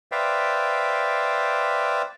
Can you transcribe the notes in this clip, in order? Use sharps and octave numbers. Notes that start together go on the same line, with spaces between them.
B4 C5 D5 E5 F5 G5